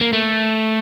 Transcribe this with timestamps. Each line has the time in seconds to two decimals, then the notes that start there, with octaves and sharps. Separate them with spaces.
0.01 A#3
0.13 A3